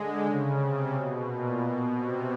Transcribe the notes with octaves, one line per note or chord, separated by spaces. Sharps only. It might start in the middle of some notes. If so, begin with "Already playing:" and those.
Already playing: D3 G#3
C#3
C3
B2
A#2
B2
C3